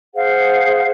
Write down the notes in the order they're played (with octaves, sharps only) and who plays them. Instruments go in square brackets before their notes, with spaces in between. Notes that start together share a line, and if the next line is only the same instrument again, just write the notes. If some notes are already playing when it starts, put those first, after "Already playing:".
[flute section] G#4 C5 F5 F#5